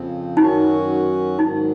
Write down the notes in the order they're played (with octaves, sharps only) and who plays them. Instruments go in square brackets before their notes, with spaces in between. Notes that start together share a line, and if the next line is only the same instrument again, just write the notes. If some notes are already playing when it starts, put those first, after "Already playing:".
Already playing: [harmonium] F2 C#3 F3 C4
[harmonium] F#2 D#3 F#3 C#4 F#4 [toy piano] D#4
[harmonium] G#2 D#3 F#3 [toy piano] D#4